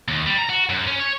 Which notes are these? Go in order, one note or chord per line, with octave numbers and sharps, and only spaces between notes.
D#2
G3
A#5
F#4
F#2
C#4
C#5